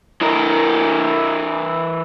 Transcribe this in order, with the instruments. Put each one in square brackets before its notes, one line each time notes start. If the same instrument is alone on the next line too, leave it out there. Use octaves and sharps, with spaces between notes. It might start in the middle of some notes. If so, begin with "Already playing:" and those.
[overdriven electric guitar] E3 A#4